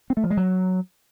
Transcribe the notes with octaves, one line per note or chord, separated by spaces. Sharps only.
C4
A3
F3
G#3
F#3